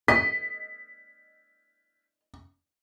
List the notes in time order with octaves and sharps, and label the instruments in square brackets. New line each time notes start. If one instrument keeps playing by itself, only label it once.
[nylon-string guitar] D#5 [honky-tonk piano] B6